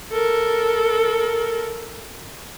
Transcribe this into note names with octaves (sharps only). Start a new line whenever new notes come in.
A4 A#4